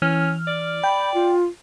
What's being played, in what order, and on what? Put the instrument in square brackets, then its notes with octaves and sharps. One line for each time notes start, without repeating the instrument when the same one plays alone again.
[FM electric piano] E3 F6 [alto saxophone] C#4
[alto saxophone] D5
[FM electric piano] G5 [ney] B5
[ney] F4